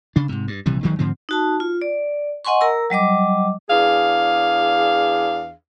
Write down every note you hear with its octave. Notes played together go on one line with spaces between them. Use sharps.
C#3 D4
G#2 C3
G2
A#1 C3 E3 G3
G1 D#3 F#3 G#3
G#2 D3 F3 C4
D#4 F#4 A5
F4
D5
D#5 F#5 G#5 C6 C#6
A#4 A#5 E6
F#3 G3 D#5 D6
E2 D4 G#4 F5